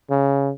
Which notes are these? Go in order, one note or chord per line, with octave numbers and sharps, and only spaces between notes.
C#3